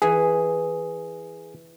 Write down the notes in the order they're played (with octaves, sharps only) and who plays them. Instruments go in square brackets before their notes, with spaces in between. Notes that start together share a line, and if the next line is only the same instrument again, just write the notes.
[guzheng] E3 F#5 [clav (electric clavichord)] G#4